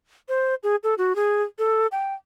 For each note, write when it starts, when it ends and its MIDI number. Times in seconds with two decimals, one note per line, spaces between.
0.29 0.55 72
0.63 0.76 68
0.83 0.94 69
0.98 1.16 66
1.16 1.43 68
1.59 1.87 69
1.92 2.14 79